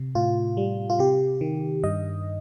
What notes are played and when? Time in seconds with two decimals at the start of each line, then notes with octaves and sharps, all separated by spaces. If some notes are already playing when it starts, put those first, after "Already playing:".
Already playing: C3
0.15 A2 F4
0.57 G3
0.90 F4
0.99 C3 G4
1.41 D#3
1.83 G2 D#5